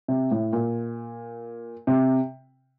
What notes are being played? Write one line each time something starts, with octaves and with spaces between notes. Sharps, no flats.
C3
A2
A#2
C3